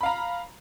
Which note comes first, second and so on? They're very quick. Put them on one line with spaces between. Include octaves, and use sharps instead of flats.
B5 F5 A#5